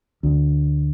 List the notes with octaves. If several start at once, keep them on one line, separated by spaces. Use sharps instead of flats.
D2